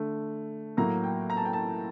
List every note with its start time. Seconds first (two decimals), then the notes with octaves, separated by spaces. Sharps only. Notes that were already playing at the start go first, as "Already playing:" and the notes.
Already playing: D3 A3
0.77 A2 F#3 A#3 A#5
1.04 G5
1.30 A#5
1.37 A5
1.45 G5
1.53 A5